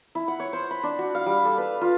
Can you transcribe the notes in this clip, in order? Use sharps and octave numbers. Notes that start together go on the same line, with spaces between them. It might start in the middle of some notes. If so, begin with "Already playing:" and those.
E4
F#5
C#5
C5
B5
D4
F#4
F5
G3
A4
B4
F4